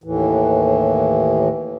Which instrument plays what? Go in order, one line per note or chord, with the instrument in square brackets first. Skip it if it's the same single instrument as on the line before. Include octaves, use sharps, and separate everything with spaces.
[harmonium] D#2 A2 E3